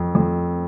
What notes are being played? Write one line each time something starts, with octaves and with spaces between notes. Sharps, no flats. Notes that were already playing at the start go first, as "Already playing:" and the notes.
Already playing: F2
F2